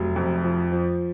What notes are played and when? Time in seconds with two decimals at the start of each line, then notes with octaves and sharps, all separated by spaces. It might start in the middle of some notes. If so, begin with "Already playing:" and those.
Already playing: F1 F#3
0.16 F2
0.44 F3
0.72 F3